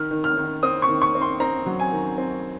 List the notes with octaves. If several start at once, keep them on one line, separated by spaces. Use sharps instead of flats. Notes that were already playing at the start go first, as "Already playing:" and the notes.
Already playing: D#3 F6
D#3
F6
D#3
C4 D#6
C#6
D#3
C#6
C4
C6
C4 A#5
F#3
G#5
D#3
C4